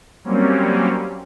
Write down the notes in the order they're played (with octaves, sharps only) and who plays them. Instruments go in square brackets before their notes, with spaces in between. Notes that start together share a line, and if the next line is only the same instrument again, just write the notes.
[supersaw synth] F#3 G3 A#3 C4 C#4